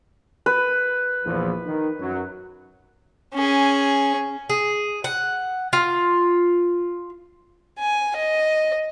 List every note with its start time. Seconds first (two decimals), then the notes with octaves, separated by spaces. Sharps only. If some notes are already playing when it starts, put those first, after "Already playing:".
0.46 B4
1.26 A#1 E2 F3
1.66 D#3
2.01 F#2 F#3
3.34 C#4 G#4
4.50 G#4
5.04 F#5
5.73 F4
7.79 G#5
8.16 D#5